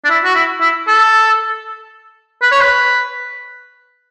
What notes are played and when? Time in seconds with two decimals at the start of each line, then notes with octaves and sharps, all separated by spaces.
0.05 D4
0.10 E4
0.24 F#4
0.35 E4
0.61 E4
0.88 A4
2.42 B4
2.52 C#5
2.61 B4